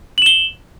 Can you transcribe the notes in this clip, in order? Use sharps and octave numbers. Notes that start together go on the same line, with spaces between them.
E7 F#7 G7